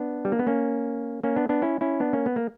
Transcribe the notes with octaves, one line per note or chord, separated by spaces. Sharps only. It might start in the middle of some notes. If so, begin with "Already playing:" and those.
Already playing: B3 D4
G3
A#3
B3
A#3 C#4
A#3 C#4
B3 D4
B3 D4
C#4 E4
C#4 E4
B3 D4
A#3 C#4
B3
A#3